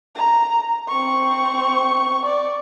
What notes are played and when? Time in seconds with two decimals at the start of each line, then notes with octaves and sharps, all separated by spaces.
0.15 A#5
0.88 C4 C#6
2.25 D5